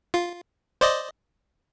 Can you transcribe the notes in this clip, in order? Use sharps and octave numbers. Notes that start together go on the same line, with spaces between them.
F4
C5 D5 D#5